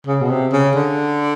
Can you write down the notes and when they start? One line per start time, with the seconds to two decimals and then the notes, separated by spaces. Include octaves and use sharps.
0.07 C#3
0.21 B2
0.30 C3
0.53 C#3
0.76 D3